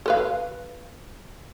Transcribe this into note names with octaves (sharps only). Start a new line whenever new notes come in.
A4 B4 F5